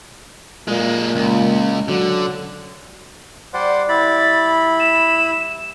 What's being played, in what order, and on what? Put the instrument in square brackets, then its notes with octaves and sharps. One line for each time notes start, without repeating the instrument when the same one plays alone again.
[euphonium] A#2 [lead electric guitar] G#3 A#3
[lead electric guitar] C#2
[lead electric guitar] D3 [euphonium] F#3
[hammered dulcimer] G3 [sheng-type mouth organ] C5 D5 F#5
[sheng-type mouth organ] E4 B5 [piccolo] A6
[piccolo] E7